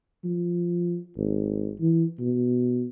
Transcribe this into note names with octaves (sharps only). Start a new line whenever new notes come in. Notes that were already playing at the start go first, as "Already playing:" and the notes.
F3
G#1
E3
B2